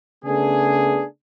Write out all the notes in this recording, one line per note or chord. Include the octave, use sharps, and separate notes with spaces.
C#3 A3 B3 D4 G#4